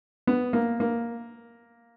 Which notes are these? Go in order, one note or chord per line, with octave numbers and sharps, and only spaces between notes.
B3
A#3
A#3